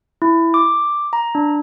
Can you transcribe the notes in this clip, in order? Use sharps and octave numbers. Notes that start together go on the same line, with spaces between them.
E4
D6
A#5
D4